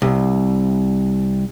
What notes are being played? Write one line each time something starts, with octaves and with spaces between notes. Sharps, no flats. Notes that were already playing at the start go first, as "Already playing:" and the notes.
C2